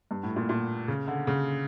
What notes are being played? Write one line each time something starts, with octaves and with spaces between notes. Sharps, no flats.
G2
A2
A#2
A#2
C#3
D3
C#3